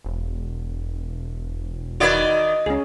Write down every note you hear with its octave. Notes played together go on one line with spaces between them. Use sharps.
E1
D#3 E4 F#4 B4 D5 D#5
C#2 C#4 G#4